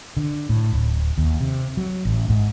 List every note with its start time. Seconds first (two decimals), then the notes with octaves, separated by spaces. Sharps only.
0.17 D3
0.49 A2
0.72 D1
1.18 D#2
1.41 C3
1.77 F#3
2.05 A1
2.30 G#2